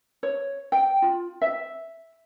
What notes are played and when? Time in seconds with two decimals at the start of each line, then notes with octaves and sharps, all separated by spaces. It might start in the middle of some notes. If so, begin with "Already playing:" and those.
0.23 C#5
0.72 G5
1.02 F4
1.42 E5